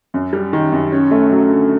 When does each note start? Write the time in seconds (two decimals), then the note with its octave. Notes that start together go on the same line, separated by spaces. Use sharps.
0.14 F#2
0.33 G3
0.53 D#3
0.72 F#2
0.92 C#4
1.11 A3
1.31 F#3
1.50 D3